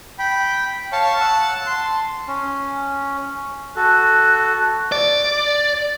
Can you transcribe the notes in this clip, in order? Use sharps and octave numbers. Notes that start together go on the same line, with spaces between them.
G5 B5
C#5 F5 A5 C#6
F#5 E6
C6
C#4
F#4 A4 F#6
D5